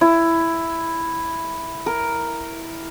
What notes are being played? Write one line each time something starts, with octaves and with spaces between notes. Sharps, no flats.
E4
A#4